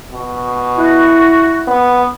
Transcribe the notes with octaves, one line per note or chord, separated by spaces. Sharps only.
B2
E4 F#4
B3